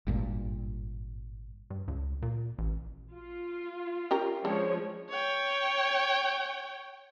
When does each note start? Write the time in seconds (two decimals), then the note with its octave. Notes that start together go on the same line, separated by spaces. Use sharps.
0.07 G#1 G2 A#2
1.70 G2
1.88 C#2
2.22 A#2
2.59 A1
3.14 F4
4.11 C#4 G4 A#4
4.45 C#3 F3 G#3 D4 C#5
5.10 C#5 G5